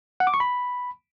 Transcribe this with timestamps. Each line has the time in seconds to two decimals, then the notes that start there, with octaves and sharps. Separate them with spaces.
0.20 F#5
0.27 D6
0.34 C#6
0.40 B5